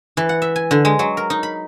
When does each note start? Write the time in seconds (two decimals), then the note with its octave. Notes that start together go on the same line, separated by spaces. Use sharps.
0.17 E3
0.29 F#5
0.42 E5
0.56 G#5
0.71 D3
0.85 G#3
0.99 F#3
1.17 A#4
1.30 D#4
1.43 B5